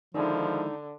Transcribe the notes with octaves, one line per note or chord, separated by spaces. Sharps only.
D3 D#3 F3 G#3 D#4 E4